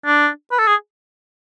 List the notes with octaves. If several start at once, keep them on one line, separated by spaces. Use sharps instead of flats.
D4
B4
A4
G#4